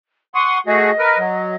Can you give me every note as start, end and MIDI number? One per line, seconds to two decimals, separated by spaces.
0.35 0.58 78
0.35 0.58 84
0.35 0.60 85
0.35 0.58 87
0.67 0.91 57
0.67 0.91 66
0.67 0.91 68
0.67 1.55 75
0.99 1.18 70
0.99 1.18 71
1.18 1.56 54